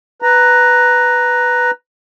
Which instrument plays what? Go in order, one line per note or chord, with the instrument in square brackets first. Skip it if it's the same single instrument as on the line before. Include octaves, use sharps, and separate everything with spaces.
[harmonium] B4 A#5